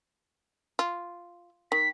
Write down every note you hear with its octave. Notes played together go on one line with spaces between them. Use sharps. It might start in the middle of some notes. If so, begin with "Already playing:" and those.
F4
D#3 B6